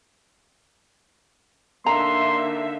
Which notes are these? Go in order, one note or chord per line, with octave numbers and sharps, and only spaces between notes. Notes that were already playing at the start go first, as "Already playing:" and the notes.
D3 A#3 D#4 E5 A#5 C6